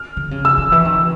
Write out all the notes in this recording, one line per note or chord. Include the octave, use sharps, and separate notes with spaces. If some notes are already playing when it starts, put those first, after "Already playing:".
Already playing: F6
D3
C#3
E6
D#3
E3
D#3